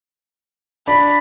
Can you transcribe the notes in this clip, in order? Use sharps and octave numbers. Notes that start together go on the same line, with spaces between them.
D4 B5